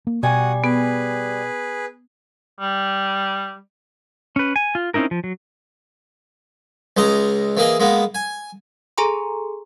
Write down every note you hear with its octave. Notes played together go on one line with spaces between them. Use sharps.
A#3
B2 G3 F#4 F#5 G#5 D#6
B3 G#4 B4
G3
C#4 B4
G#5
F4
C4 C#4 D#4 E4 A#4
F3
F#3
C#2 G#3 D#5 A#5
E3 A#3 G#4 D#5
G#3 A#3 B3
G#5
G#4 A4 G#5 A#5 C6